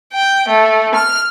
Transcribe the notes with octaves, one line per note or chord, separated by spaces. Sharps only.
G5
A3
F6